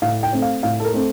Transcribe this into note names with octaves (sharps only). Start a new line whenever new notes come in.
A2 F5
G5
A3 C4
F5
A2 F5
A4
A#4
A3 C4